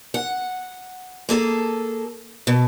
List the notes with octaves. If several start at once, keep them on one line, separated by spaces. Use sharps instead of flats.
F#5
A#3 G#4 A4
B2